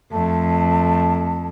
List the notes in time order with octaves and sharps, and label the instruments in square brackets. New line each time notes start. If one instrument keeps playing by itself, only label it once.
[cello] F2 [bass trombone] A3 [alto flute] A5